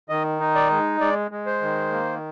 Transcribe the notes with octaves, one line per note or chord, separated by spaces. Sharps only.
D#3 D#5
D#4
D5
G#3
G#3 D5
G#3
C5
D#3
A#3